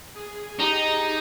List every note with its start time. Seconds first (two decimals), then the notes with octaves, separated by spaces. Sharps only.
0.15 G#4
0.59 D#4 G4